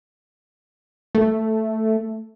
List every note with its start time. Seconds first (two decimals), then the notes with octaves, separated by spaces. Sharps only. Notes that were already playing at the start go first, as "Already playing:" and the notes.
1.15 A3